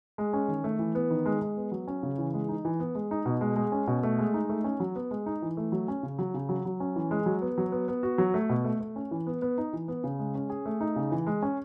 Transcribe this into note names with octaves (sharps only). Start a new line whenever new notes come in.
G#3
C#4
D#3
A3
E3
B3
D#3
G#3
G#3
B3
F#3
C#4
C#3
E3
G#3
D#4
E3
B3
G#3
D#4
B2
G#3
G#3
C#4
B2
A3
G#3
D#4
A3
C#4
F#3
B3
G#3
D#4
E3
A3
F#3
C#4
C#3
F#3
C#3
F#3
F#3
C#4
E3
G#3
F#3
B3
F#3
B3
B3
F#4
F#3
A3
B2
A3
A3
C#4
E3
B3
B3
D#4
E3
B3
C#3
G#3
C#4
G#4
A3
D#4
C#3
E3
G#3
C#4